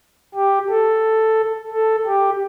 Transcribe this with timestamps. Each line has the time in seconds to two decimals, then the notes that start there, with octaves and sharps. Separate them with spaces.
0.35 G4
0.70 A4
1.72 A4
2.06 G4